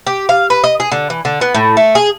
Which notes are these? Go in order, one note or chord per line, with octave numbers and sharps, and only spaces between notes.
G4
F5
B4
D#5
G#4
D3
E3
D3
B3
A2
A3
G#4